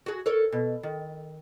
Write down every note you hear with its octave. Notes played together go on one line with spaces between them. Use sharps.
F#4 G#4
A4 A#4 C#5
B2
D#3